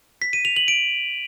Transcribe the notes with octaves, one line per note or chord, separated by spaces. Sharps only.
B6
D#7
F7
F#7
D7